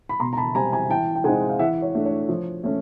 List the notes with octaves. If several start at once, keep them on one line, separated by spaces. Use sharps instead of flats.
B5
B2 A#5 C6
A#5
A5 B5
G3 C4 G#5 A#5
G#5 A#5
E3 G5 A5
G5
G#3 C4 D#4 F#5 G#5
F5
E3 E5 F#5
C#5
A3 D4
C#5
F3
A3 C#4